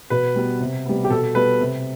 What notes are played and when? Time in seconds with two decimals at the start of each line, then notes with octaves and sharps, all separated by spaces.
0.10 B2 B4
0.36 G3 B3
0.60 C3
0.86 G3 B3
1.04 G4
1.10 B2 A4
1.35 G3 B3 B4
1.60 C3